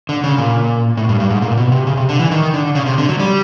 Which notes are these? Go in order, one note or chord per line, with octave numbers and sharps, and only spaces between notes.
D3
C#3
A#2
A2
G2
G2
G#2
A#2
B2
C3
C#3
C3
D3
E3
D#3
D3
C#3
C3
D3
F#3
G3